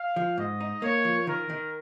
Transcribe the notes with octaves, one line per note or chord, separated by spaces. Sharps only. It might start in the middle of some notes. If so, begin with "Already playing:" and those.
Already playing: F5
F3
G#2 D#5
D#4
A#3 C#5
F3
D#3 A#4
D#3